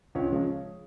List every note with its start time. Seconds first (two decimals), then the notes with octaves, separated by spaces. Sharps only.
0.15 C#2 C#5
0.32 C#3 F3 G#3